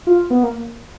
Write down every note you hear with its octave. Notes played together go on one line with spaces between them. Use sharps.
F4
B3
A#3